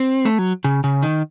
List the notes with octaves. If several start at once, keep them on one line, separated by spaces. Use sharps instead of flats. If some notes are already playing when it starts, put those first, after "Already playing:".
Already playing: C4
A3
F#3
C#3
C#3
D#3